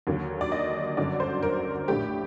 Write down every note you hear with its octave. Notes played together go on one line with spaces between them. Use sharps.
D#2 D3 F#3 A#3
D5
D#5
G1 F#2 D3 F#3 D5
C5
A#4
A#1 A2 A3 D4 G4